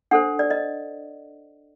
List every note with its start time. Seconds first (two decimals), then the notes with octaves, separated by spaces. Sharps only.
0.11 D4 A4 C5 F#5
0.39 D5
0.51 D#5